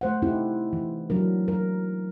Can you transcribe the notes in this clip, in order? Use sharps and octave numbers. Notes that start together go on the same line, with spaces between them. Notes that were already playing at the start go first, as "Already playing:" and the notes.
A3 C5 F#5
C4 D#4 E4 G4
E3
F#3 D4 A#4
A#4